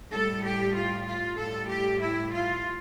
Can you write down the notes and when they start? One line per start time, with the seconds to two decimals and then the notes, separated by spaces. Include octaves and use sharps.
0.11 A2 G3 A4
0.43 G4
0.75 F4
1.06 F4
1.37 A2 G3 A4
1.68 G4
2.00 E4
2.31 F4